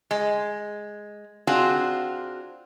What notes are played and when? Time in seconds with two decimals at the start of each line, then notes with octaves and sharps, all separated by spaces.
0.11 G#3
1.47 C4 D4 F4 F#4 G#4